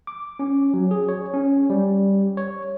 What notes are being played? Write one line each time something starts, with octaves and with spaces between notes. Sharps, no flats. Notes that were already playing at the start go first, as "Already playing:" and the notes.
D6
C#4
F#3
G#4
C#5
C#4
G3
C#5